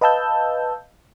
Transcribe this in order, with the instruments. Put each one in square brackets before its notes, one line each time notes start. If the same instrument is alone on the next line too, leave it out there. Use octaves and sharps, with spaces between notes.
[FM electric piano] B4 D#5 F5 A5 E6 G6